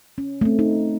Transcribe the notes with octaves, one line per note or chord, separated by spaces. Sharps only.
C#4
A3 C4
D#4